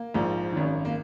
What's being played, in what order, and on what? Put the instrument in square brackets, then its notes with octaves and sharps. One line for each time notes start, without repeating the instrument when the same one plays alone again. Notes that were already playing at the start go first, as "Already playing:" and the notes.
Already playing: [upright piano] A#3
A#1 G#2 F3
G#1 F#2 D#3
A#3